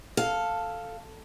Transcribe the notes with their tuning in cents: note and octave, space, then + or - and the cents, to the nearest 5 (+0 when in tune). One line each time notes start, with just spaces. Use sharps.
A4 +5 F5 +0